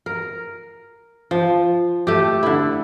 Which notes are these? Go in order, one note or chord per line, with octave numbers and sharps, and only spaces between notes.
A#4
F3
A3 G4
D3 E4